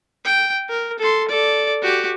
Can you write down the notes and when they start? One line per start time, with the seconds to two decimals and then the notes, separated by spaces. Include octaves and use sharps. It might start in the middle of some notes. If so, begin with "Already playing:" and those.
0.25 G5
0.69 A#4
0.99 A4 C6
1.28 A4 D5
1.82 F#4 G4